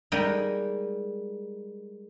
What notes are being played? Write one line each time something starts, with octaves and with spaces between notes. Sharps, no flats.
G3 G#3 A#3 D#4 G#5